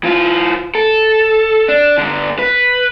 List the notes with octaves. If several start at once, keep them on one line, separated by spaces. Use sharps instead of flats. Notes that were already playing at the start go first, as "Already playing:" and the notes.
E3 F4
A4
D4
G2 D3
B4